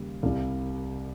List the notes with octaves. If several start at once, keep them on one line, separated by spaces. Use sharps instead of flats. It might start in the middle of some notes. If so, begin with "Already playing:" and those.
Already playing: D#2 C#3 G3
C2 C3 G3 F5